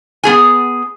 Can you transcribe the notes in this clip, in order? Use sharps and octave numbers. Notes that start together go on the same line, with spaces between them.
B3 G#4 G#5